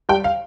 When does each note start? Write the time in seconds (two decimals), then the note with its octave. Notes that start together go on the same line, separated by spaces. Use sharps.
0.09 G3 G5
0.24 F5